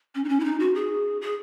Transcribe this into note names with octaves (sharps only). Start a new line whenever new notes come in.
C#4
D#4
C#4
E4
D#4
F#4
G#4
G#4